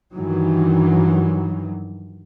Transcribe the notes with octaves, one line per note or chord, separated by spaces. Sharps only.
G2 D#3 E3 F#3